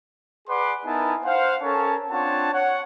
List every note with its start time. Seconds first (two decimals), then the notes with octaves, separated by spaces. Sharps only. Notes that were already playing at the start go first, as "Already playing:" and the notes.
0.48 G#4 B4 D5 F#5 C6 D6
0.85 B3 D#4 E4 A#4 G#5 A5
1.24 C5 F5 F#5
1.62 C#4 A4 A#4 C#5 A5
2.10 C4 D4 F4 C#5 F#5 A5
2.52 C#5 F#5